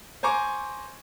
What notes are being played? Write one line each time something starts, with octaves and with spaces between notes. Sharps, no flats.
C5 G#5 A#5 C#6 D6